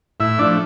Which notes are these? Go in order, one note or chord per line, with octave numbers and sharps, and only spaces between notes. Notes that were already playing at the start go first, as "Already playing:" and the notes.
A2 E4 E5
F3 A3 D4 D5